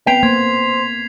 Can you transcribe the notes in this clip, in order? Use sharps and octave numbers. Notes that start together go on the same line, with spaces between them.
B3 C4 B4 G5 B6 C7 F7
A#3 C5 G#6